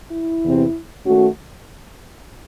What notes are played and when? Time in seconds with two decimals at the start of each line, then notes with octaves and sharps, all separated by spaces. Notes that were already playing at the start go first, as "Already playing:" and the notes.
0.10 E4
0.42 E2 C3 E3 C4
1.05 D#3 A3 C#4 F#4